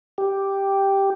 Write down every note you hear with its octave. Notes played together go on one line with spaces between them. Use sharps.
G4